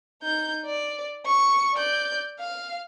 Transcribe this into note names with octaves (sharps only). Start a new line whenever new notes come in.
D#4 G6
D5
C#6
D5 G6
F5